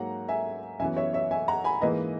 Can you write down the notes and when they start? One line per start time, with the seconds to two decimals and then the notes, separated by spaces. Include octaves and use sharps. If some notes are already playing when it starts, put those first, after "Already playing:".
Already playing: G#2 F#3 A#3 F#5 A#5
0.29 E5 G#5
0.80 F#2 E3 B3 E5 G#5
0.97 C#5 E5
1.13 C#5 E5
1.31 E5 G#5
1.48 F#5 A#5
1.64 G#5 B5
1.81 G#2 E3 A#3 B4 D#5